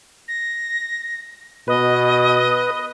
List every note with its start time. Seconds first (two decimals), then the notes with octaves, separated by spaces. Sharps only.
0.28 A#6
1.68 B2 B4 D#5